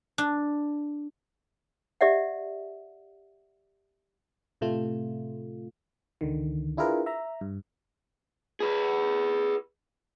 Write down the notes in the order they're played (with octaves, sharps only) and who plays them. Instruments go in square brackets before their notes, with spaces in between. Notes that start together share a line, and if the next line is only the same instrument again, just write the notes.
[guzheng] D4
[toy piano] G4 D5 E5 F#5
[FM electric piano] A2 C3 A3 F4
C#2 D3 D#3
D4 E4 F4 G#4 A#4 B4
E5 A#5
G2
[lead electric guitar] G#4 B4